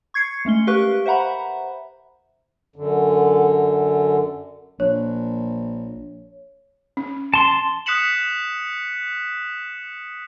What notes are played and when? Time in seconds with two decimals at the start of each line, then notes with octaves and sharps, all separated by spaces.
0.14 C#6 G#6 C7 C#7
0.45 G#3 A3 C#4 G7
0.67 G4 A#4 B4 F5 C#6 F#6
1.06 C5 E5 F#5 A#5 B5
2.76 F#2 D3
4.80 A#1 C#5
6.97 C#4
7.34 A5 C6
7.86 D#6 F#6 B6 C#7 E7 F#7